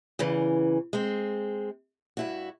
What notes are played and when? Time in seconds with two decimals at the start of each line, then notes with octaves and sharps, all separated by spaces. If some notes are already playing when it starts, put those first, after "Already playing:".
0.19 E2 C#3 E3
0.93 G#3 C4
2.17 G2 E4 F#4